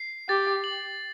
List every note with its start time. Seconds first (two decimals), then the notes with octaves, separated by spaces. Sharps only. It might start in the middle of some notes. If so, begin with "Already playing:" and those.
Already playing: C7
0.29 G4 A6
0.64 F#7